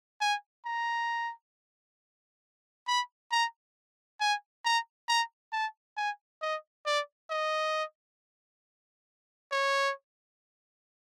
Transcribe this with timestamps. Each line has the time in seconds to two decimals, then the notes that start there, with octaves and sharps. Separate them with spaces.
0.21 G#5
0.66 A#5
2.87 B5
3.32 A#5
4.20 G#5
4.65 A#5
5.09 A#5
5.53 A5
5.97 G#5
6.42 D#5
6.86 D5
7.30 D#5
9.52 C#5